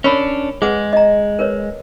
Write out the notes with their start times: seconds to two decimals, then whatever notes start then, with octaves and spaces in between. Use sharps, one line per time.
0.04 C#4 D4 A#4 C#5 B5
0.62 G#3 G#4 B4 F#5
0.93 D#5 A#5
1.39 A#4 B4 C#5